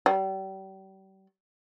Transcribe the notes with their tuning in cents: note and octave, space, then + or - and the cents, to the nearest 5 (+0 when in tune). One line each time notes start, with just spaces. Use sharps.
G3 -35